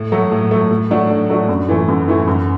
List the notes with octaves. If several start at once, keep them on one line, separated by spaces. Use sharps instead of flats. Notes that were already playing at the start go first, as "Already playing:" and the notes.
Already playing: A2
F#3 A3
A2
F#3 A3
A2
F#3 A3 D4 F#4
A2
F#3 A3 D4 F#4
F#2
E3 A3 E4
F#2
E3 A3 E4
F#2